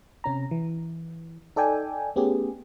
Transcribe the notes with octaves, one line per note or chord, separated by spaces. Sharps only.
C3 C#4 A#5
E3
D#4 A4 D5 G5 G#5
A3 B3 C#4 G4 G#4